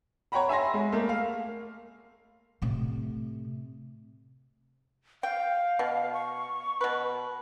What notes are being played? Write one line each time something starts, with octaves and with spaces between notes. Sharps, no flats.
C#5 F#5 G5 A#5 B5
E5 G#5 B5 C6 A#6
G#3
A3 A#3
F5
A2 C3
F5 G5
B2
C#6
B2 B4